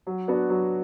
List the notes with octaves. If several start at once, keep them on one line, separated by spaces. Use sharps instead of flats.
F#3
B3 D4 F#4
F#3